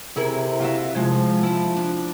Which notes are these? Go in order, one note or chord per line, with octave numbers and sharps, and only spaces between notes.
C3 E4 G#4 A#4
F4 F#4 E5
C3 F3 G#3
E4
D4